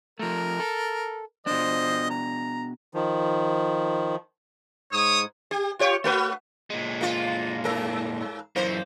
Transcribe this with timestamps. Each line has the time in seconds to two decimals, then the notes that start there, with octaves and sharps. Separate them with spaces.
0.19 F3 A3 A#4
0.60 A4
1.47 B2 F3 D4 C5 D#5
2.10 A#5
2.94 D#3 F3
4.92 G#2 C#5 D#6
5.51 G4
5.79 F4 G4 C#5
6.04 A3 F#4 B4
6.70 A#2 G#3
7.01 A#3 F4
7.64 G#2 A#4
8.56 F#2 E3 A#3 C5